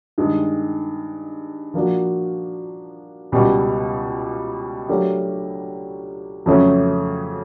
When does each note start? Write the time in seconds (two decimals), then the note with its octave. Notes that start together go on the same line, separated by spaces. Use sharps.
0.18 G2 D#3 G#3
1.74 F3 A#3 D4 F#4
3.32 C#2 B2 G3
4.88 F#3 A3 D4 G4 A#4
6.46 F2 C#3 F#3 A3 C#4